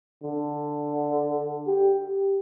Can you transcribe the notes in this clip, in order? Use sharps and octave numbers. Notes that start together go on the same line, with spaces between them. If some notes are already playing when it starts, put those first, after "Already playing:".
D3
G4